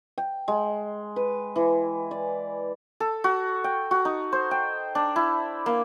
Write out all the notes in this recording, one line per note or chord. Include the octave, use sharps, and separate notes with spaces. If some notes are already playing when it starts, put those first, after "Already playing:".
G5
G#3
B4
E3
D5
A4
F#4
G5
F#4
D#4
C5
G5
D4
E4
A#3